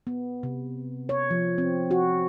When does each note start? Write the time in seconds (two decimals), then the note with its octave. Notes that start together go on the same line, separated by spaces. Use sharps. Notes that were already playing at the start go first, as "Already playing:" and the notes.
0.07 B3
0.43 C3
1.09 C#5
1.31 F3
1.58 C4
1.91 F#4